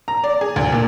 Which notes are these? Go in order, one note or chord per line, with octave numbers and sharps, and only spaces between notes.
A#5
D5
G#4
D2
A#2